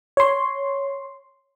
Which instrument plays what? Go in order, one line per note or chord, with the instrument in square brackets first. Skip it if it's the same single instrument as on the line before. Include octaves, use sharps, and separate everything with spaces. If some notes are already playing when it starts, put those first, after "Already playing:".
[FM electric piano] C#5 C6